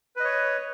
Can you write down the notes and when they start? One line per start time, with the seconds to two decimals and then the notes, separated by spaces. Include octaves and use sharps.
0.16 B4
0.20 D#5
0.24 C#5